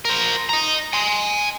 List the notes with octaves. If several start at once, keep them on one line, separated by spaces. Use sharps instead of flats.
A#4 C5
D#5 A#5
G#5 C6